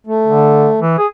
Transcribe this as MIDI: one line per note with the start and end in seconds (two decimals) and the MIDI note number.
0.07 0.80 57
0.27 0.69 50
0.80 0.96 52
0.98 1.07 68